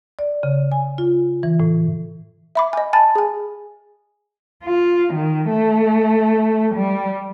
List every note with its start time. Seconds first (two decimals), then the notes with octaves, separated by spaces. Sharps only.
0.19 D5
0.43 C#3
0.72 G#5
0.98 F4
1.43 E3
1.60 A2
2.55 E5 B5 D6
2.73 D#5 G#5
2.93 G#5 A5 B5 A6
3.15 G#4 G#5
4.64 F4
5.13 D#3
5.49 A3
6.75 G3